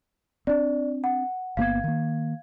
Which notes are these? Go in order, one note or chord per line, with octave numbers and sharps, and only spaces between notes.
C4 D4 D5
F#5
G1 A#3 B3 F5 G#6
D#3 A#3